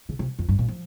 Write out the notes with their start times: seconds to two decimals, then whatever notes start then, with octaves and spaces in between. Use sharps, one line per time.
0.09 C#3
0.19 C3
0.39 F2
0.48 G2
0.59 A#2
0.68 F3